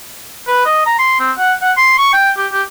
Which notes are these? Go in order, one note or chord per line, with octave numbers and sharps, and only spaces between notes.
B4
D#5
A#5
C6
C4
F#5
F#5
C6
C#6
G5
G4
G4